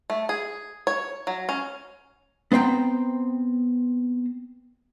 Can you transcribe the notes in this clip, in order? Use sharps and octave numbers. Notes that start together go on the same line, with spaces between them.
A3
G#4
C#5
F#3
C#4
B3 C4 C5 G5 A#5